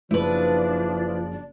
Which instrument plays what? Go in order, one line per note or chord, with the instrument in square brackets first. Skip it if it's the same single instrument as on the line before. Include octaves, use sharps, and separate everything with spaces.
[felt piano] F#1 [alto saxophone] F3 [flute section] D4 D5 [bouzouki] E4 B4